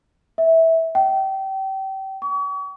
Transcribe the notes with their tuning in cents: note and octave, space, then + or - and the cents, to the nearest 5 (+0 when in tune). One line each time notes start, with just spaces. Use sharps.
E5 -15
G5 -30
C#6 +40